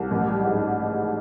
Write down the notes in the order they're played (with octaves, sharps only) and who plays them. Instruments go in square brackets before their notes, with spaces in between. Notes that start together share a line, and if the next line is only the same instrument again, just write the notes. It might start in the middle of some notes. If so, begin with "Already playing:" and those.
Already playing: [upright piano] C2
A1
G3
G#2